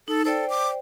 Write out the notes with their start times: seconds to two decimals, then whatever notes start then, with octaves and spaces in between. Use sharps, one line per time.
0.08 D#4 A4
0.25 A4 C5 D5 G5
0.50 D6